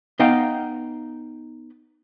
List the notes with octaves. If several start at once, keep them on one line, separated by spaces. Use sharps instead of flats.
B3 D#4 D#5 F5 G5